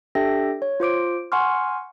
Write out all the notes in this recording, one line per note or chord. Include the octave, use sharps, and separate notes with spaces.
D4 G4 A4 E5 G5 A#6
C#5
F4 C5 D6 D7
F#5 G#5 C6 C#6 F6